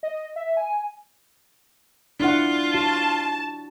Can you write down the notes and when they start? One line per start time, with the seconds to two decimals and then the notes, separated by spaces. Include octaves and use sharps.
0.03 D#5
0.36 E5
0.57 G#5
2.20 D4 E4 F4 F#5
2.74 F#4 A5